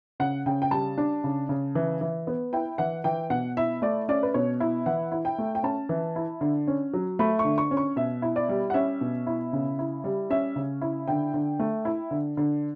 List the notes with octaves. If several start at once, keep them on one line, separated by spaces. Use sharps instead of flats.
C#3 F#5
C#3 G5
G5
G3 A5
D4
C#3
C#3
E3
E3
B3
E4 G5
E3 F#5
E3 G5
B2 F#5
E4 E5
A3 D5
C#4 D5
B4
B2 C#5
E4
E3 F#5
E4
G5
A3
G5
C#4 A5
E3
E4
D3
C#4
F#3
A3 B5
C#6
D3
C#6
C#4
C#6
B2 E5
E4
D5
G3
F#5
C#4 E5
B2
E4
C#3
E4
G3
C#4 E5
C#3
E4
D3 G5
D3
A3
E4
D3
D3